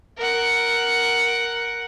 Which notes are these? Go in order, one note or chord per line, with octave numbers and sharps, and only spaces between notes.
A#4 F#5